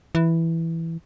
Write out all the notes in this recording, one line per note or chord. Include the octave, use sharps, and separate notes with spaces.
E3